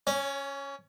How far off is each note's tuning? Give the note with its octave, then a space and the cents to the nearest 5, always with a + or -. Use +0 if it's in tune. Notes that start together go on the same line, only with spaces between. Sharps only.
C#4 -5 C#5 +25